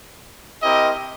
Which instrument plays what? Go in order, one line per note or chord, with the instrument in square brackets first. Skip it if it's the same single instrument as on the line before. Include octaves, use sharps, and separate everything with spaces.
[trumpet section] C4 E4 G4 A#4 D#5